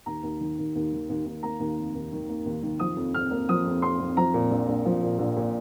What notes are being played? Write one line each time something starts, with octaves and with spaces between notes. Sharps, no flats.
D#2 A#5
D#2
D#3
D#2
D#2
D#3
D#2
D#2
A#3 A#5
D#2
F1
D#2
D#3
A#3
D#2
D#3
F3 D#6
F2
F2 F6
A#3
F3 D#6
F2
F2 C6
F2
F3 A#5
A#2
A#1
A#1
F3
A#2
A#1
A#2